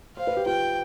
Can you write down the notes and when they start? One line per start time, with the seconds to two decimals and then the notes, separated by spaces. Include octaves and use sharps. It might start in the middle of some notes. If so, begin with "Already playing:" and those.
0.17 C5 F5
0.27 B4
0.37 G4
0.46 F4 G5